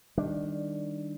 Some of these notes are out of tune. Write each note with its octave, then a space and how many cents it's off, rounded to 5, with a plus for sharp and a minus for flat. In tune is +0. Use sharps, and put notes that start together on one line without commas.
D#3 +0 G3 +15 D4 +0